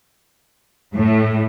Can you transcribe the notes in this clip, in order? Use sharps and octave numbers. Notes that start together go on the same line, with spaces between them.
A2